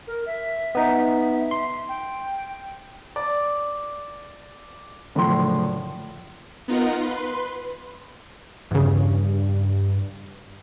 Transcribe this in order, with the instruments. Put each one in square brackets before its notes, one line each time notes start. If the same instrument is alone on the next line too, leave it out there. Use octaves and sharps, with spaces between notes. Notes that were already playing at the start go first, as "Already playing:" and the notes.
[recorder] A#4
E5
[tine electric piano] B3 D#4
C6
[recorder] G5
[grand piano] D5
F#1 A2 D3 F3 C6
[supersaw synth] B3 D#4 F4 A#4 F#5
B4 C6
[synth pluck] E2 C#3 [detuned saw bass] G2